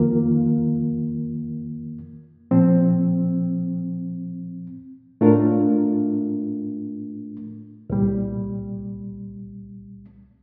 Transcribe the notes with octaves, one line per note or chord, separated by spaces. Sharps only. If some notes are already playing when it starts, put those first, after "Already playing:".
Already playing: F2 D#3 A#3 F4 A#4
A#2 F3 C4
A2 A3 D4 F4 A#4
C2 A#2 G3